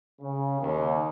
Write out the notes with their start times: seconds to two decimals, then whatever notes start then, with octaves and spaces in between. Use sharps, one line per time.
0.22 C#3
0.60 D#2